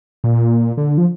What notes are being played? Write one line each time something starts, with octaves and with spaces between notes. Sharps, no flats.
A#2
D3
F3